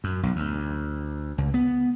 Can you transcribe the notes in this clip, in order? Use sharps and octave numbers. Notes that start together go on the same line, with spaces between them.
F#2
B1
D2
C#2
B3